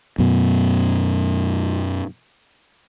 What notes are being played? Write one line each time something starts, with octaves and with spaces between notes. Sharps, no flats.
F#2 B2